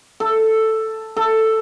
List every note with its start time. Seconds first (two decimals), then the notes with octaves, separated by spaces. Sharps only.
0.20 A4
1.17 A4